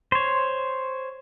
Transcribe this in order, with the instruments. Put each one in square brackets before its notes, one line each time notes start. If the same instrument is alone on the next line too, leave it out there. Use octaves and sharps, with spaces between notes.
[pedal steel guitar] C5 C#5